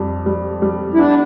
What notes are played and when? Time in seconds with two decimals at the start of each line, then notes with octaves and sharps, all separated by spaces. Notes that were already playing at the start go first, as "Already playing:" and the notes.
Already playing: F2 G3
0.26 G3
0.62 G3
0.94 E4
0.98 B3 D4